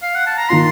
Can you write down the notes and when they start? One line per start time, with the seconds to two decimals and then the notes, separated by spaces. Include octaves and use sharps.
0.02 F5
0.15 F#5
0.27 A5
0.38 A#5
0.49 D#3 A#3 F4 C6